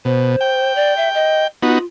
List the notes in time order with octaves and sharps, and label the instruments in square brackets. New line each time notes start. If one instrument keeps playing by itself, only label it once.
[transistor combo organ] B2 [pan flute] C5
[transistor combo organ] G5
[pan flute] D5
E5
D#5
[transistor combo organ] B3 D#4 F#4 [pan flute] F4